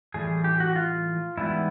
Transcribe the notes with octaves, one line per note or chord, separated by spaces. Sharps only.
A2 E3 G3 G#4
G4
F#4
F4
G#2 E3 G3 B3 E4